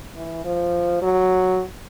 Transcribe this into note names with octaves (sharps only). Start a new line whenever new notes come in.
E3
F3
F#3